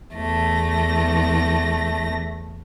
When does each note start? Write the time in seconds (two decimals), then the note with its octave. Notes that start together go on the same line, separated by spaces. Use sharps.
0.15 E2 A3 A#6